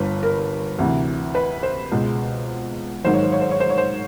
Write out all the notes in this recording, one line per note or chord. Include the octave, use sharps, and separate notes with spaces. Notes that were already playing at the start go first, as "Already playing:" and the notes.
Already playing: G1 G2 D3 B4
A#4
D2 C3 E3
B4
C5
C#2 B2 G#3
G#1 G#2 D#3 F#3 C5
C#5
C5
C#5
C5
C#5
C5
C#5
C5